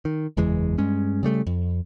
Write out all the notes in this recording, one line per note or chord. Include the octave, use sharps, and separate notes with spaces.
D#3
F#1 E2 E3 G#3
G2 G#3 C#4
C#3 G3 A3
F2